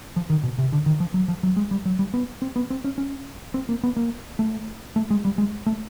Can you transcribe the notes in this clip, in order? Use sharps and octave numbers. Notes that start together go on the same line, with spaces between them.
F3
D#3
B2
C3
D3
D#3
F3
F#3
F3
F#3
G#3
G3
F#3
G3
B3
C4
B3
C4
C#4
C#4
C4
A#3
B3
A#3
A3
A3
G#3
G3
G#3
A3